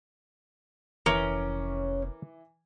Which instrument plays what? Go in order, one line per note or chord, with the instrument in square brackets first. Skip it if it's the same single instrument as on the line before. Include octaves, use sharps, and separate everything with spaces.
[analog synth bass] F1 [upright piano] E3 D6 [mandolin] C#4 [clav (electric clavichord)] A#4